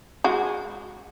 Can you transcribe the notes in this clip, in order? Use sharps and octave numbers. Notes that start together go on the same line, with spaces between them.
G#3 F#4